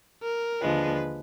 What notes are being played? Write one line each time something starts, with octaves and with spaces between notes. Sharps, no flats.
A#4
D#2 D3 F3 G#3 D4 B4